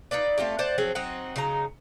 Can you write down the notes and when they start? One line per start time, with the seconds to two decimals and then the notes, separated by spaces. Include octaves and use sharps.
0.11 D#4 F4 B4 D5
0.38 A3 C4 F4 G4
0.59 C5 D5 F#5
0.78 F3 F#3 C4 G#4
0.95 F#3 C4 D#4 F#5
1.36 C#3 F#3 D#4 A#5